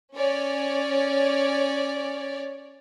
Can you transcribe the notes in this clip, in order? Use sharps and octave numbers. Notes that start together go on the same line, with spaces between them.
C#4 C#5 D5